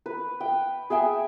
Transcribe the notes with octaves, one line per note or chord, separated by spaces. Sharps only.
B4
G5
G#4 E5 G5 G#5